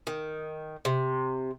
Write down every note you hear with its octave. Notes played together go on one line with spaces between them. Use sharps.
D#3
C3